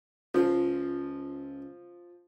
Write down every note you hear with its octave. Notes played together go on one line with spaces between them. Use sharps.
C#2 F3 F5